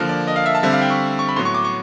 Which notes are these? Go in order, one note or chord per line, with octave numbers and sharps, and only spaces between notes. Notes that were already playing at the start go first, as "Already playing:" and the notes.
Already playing: D3 F3 A#3 A#4
D5
D#5
F5
E5
A5
D3 G3 C4 E5
F5
G5
C#6
C#6
B5
A2 F#3 B3 C6
C#6
D6
C#6